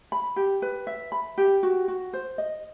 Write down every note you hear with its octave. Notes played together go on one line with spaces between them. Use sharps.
B5
G4
B4
E5
B5
G4
F#4
F#4
C5
D#5